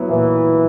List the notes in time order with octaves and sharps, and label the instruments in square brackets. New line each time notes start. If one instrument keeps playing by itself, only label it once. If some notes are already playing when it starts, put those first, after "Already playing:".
Already playing: [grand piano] F#3 B3 E4
[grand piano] A#2 [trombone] E3